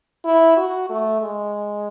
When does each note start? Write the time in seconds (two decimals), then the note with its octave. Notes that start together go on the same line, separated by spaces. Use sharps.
0.25 E4
0.57 F#4
0.90 A3
1.22 G#3